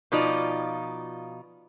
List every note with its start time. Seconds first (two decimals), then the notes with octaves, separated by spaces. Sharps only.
0.12 B2 F3 D#4 F4 D5